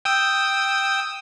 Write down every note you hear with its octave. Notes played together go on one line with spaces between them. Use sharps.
G5 D#6 E6